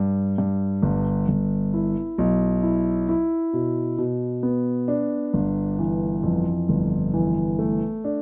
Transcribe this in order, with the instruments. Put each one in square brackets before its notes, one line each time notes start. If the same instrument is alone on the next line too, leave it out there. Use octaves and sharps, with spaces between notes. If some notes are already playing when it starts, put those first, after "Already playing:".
Already playing: [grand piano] G2
G2
G1
G1
E4
B1
E4
E4
B2
B2
B3
D4
G1
E3
F2
G1
E3
A3
D4